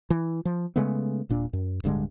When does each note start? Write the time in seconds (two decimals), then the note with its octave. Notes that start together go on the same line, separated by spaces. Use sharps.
0.10 E3
0.45 F3
0.76 C#3 G#3 A3 B3
1.29 D#1 A#2 D4
1.53 F#2
1.84 D1 G2 D3 G#3